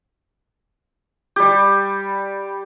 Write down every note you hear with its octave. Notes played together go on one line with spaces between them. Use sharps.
G3 G4